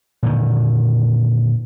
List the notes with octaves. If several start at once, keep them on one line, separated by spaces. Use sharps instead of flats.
A#2 D3 D#3